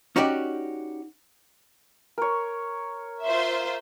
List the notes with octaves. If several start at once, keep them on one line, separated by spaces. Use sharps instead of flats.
C#4 D#4 F#4 G4 D5
A#4 C#5
F4 C5 E5